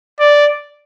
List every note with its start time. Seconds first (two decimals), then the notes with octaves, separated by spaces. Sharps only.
0.20 D5